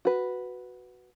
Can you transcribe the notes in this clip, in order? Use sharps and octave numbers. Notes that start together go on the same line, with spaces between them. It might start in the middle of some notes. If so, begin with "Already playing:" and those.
F#4 B4